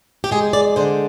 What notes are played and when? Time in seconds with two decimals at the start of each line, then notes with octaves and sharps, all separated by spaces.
0.24 G4
0.31 G#3 G#4
0.53 D5
0.76 D3 C5